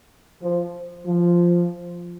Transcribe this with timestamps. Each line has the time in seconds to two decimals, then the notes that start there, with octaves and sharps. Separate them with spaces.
0.42 F3
1.07 F3